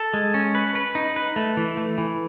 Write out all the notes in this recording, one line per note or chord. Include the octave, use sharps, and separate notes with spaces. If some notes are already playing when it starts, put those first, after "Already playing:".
Already playing: A4
G#3
C#4
B4
B4
D#4
B4
A3
E3
A3
E3